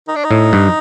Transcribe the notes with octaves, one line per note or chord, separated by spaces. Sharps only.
D#4
D4
D#4
A2
G2